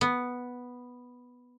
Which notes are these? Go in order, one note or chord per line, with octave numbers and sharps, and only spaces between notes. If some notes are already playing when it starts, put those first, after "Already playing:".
B3